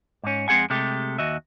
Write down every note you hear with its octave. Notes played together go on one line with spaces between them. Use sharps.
G#2 C#4
F2 G#3 C4 G#4 F#5 G#5
C3 G#3 A3 G4
D#2 F#4 D#5 E5